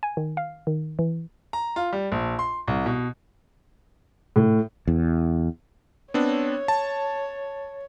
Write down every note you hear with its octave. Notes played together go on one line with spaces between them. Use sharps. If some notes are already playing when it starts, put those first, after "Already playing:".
G#5
D#3
F5
D#3
E3
A#5
F4
G3
A#1
C6
C2
B2
A2
E2
B3 C4 D4 C#5
A5